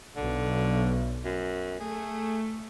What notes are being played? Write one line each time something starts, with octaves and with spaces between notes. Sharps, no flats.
B1 D3
F#2
A3 G#4